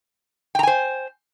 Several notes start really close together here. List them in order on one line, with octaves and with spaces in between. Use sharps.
G5 A#5 G#5 C5